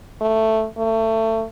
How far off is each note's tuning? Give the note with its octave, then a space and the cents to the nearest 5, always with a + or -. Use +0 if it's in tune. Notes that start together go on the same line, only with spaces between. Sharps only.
A3 +5
A3 +25